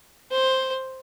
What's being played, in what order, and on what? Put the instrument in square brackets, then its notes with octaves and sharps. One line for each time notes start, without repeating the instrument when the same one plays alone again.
[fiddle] C5